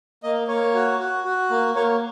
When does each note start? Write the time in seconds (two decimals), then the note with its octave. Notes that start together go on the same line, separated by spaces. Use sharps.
0.23 A#3 D#5
0.48 A#3 C#5
0.74 F#4
0.99 F#4
1.24 F#4
1.50 A#3
1.75 A#3 C#5